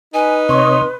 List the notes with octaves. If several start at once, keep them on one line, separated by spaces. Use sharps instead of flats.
D#4 B4 G#5
C3 C#5 D#5 C6